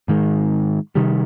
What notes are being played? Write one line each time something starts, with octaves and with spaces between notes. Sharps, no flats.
G#2 D#3 G#3
C3 D#3 G3